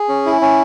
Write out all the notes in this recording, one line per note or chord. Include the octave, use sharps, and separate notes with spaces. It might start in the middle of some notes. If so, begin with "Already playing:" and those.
Already playing: G#4
C#4
E4
C#4